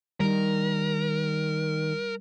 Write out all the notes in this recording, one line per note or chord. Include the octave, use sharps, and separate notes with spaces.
D#3 G3 A#4